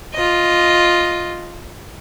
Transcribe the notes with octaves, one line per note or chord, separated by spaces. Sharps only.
F4 D#5